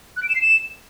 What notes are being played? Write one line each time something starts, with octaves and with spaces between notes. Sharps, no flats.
F#6
D7
E7
C7
E7